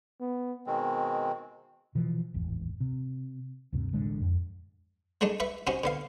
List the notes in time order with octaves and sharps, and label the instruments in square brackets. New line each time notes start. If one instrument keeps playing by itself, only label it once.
[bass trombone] B3
[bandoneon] B2 D#3 G#3 C4
[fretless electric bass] B2 E3 F3
D1 G#1 E2
C3
D2 G2 C3
A1 A2 D3 G#3
F2
[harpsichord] G#3 A3 D4 D#4
B4 E5 B5 C#6
C3 C#4 D#4 F#4 G4
D3 B3 F5